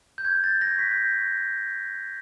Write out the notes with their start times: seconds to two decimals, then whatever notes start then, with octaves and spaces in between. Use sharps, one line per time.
0.18 G6
0.25 C#6 F#6 G#6
0.44 A6
0.61 A#6
0.78 C#6 F#6 B6
0.92 G6